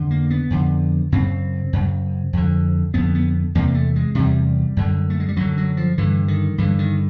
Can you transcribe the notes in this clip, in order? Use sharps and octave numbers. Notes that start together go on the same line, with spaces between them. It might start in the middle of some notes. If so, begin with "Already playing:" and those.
Already playing: F2 D3
A#3
B3
F2 D3
F#2 C#3 C4
F#2 C#3
F2 D3
F2 D3 B3
B3
E2 C3 A#3
A3
G#3
E2 C3 G3
F#2 D3
A3
G#3
G3
F#2 D3 F#3
F#3
F3
G2 D3 E3
D#3
G2 D3 E3
D#3